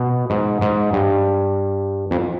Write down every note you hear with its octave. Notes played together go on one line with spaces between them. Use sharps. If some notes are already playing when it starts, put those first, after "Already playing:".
Already playing: B2
G#2
G#2
G2
F2